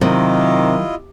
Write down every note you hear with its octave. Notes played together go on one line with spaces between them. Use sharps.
C3 D#3 F#3 E4 F4 D#5